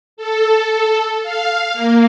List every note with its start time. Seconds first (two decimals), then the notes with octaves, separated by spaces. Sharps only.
0.17 A4
1.23 F5
1.74 A#3